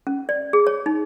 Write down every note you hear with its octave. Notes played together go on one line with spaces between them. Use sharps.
C#4
D5
G#4
C#5
D#4